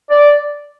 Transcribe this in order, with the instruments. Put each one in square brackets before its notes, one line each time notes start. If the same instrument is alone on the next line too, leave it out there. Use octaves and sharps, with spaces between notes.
[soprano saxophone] D5